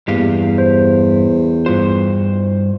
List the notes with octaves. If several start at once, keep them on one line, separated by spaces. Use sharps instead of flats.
E2 G2 A#3 G4 F5
C5
G2 F4 C5